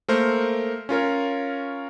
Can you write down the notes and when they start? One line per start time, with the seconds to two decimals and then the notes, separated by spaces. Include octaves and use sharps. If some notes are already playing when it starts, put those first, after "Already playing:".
0.08 A3 A#3 A#4 C5
0.89 C#4 F4 A#4 C#5